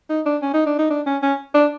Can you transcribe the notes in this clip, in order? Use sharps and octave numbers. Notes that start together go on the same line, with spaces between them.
D#4
D4
C#4
D#4
D4
D#4
D4
C#4
C#4
D4